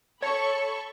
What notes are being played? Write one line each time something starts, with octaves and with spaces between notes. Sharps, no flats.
A4 C#5 B5 C#6